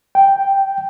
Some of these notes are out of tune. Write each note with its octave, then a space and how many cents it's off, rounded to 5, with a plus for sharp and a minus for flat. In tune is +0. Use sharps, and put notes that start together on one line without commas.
G5 -5